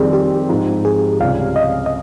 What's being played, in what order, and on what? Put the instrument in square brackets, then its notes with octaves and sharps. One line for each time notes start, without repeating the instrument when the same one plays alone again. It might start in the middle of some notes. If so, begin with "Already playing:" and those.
Already playing: [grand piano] F2 D#3 G3 C4 [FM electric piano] G#4
[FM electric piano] G4
[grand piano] G#2 F3 C4 D#4
[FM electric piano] G#4
[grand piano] C#2 C3 G3 C#4 [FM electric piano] F5
[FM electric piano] D#5
D#5